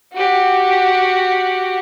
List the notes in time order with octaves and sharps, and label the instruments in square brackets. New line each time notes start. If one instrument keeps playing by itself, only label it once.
[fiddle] F#4 G4